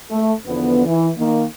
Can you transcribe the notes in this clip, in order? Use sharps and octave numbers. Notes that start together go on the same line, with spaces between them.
A3 A4
E2 D3 F3 B3
E3
D#3 A#3